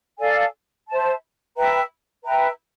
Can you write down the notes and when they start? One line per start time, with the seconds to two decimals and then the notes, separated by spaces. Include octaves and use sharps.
0.19 A4 D5 F5 G#5
0.88 C5 E5 A5
1.56 B4 E5 G5 A#5
2.23 B4 E5 G5 A#5